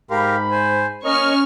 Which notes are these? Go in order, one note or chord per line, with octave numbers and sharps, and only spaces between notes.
G#2 G4 A#4 F5 B5
C5 G#5
A#3 C#4 A#4 C#5 D#5 C#6 F6